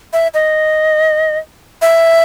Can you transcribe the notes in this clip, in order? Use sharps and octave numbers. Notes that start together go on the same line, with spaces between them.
E5
D#5
E5